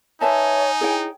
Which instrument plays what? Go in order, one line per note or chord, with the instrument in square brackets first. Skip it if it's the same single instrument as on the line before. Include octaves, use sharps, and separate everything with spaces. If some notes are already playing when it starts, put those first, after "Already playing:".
[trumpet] D#4 [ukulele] B4 E5 A5 [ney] C#5 [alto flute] G#5
[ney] E4 [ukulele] G#4 C#5 G5